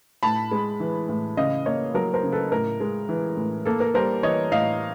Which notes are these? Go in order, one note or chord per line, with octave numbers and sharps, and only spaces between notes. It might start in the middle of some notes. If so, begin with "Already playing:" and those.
A2 A5 B5
G#3
E3
A2
C#3 D#5 F5
A#3 C#5 D#5
F#3 A#4
A#4 C5
C#3
A4 B4
A2 A#4
G#3
E3
A2
A#3 A4
A#4
G3 A#4 C5
E3 C#5 D#5
A2 D#5 F5